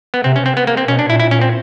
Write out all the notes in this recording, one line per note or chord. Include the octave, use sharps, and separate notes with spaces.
B3
C3 C4
C#4
C4
B3
A#3
C4
B2 C#4
D4
A#2 E4
E4
C#4
C4